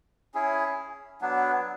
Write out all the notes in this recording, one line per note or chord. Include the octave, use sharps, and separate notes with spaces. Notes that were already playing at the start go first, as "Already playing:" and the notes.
C#4 E4 G#4
F#3 B3 D4